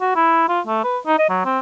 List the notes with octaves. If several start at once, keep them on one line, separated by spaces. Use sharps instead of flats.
F#4
E4
F4
A3
B4
D#4
D#5
F#3
C4